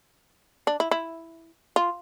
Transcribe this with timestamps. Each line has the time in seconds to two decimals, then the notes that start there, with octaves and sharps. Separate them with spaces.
0.67 D4
0.80 E4
0.91 E4
1.76 F4